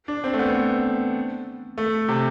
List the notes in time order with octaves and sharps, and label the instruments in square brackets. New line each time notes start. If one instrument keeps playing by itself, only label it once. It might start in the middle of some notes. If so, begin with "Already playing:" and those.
[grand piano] D4
C4
A3
B3
B3
A3
C3